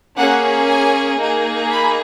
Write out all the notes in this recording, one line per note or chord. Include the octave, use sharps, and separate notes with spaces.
A#3 C#4 G#4 F#5
G#5
A#3 D#4 G#4
B5